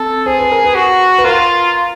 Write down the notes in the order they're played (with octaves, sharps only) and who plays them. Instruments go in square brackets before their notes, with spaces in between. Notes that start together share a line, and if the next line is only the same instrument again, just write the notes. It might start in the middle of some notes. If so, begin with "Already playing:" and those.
Already playing: [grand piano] C4 [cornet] A4
[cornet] G#4 [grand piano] C5
[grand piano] B4
A#4
B4
[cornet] F#4
[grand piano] B4
[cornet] F4 [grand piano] A#4